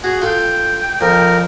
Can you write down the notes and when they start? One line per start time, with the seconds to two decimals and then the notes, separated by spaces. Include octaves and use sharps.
0.04 F#4 G#4
0.22 F4 A4 G5
1.01 F2 A#4